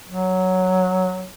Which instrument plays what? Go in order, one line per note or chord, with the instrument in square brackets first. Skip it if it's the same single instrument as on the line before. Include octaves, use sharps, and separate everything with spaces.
[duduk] F#3